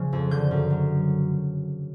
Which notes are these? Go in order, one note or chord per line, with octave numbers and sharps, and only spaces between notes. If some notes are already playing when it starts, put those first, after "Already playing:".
Already playing: C#3 F3
F2
D3 G6
F#2
F#3